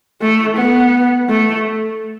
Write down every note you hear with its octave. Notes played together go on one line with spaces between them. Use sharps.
A3
B3
A3